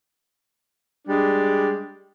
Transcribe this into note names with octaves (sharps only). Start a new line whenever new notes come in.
G3 G#3 D4